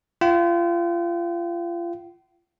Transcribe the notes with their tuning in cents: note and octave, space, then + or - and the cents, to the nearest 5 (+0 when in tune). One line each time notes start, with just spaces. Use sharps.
F4 -30 G5 -45